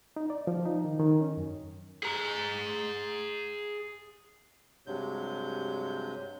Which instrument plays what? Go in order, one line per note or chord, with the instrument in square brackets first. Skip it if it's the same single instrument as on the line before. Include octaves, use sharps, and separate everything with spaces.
[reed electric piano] D#4
D5
F3
D#4
D#3
D#3
C#4
F#2
[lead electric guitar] G#4 A#5
[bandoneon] G2 C3 F#3 G#3 G6